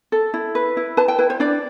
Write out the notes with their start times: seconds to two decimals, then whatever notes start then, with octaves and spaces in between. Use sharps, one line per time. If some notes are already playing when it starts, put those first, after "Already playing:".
0.12 A4
0.34 E4
0.55 B4
0.77 E4
0.97 B4 A5
1.08 G5
1.19 E4 B4
1.30 C5
1.40 D4 D5